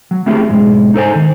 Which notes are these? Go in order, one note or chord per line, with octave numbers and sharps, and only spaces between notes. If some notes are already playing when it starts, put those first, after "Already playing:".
F#3
A3 C#4 E4 F4 G4 G#4
B1 F2 G#2 G#3
D#4 A4 C5 G#5
D#3